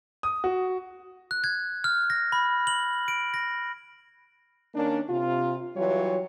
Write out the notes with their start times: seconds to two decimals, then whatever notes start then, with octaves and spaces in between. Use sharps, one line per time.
0.23 D#6
0.44 F#4
1.31 F#6
1.44 G#6
1.84 F6
2.10 A#6
2.32 B5
2.67 F#7
3.08 D7
3.34 A#6
4.74 D#3 A#3 C#4 D4
5.09 C3 F4
5.76 E3 F#3 G3 F4 G4 C#5